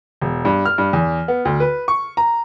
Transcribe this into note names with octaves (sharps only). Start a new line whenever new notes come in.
E1
G2
F6
G2
E2
B3
D2
B4
C#6
A#5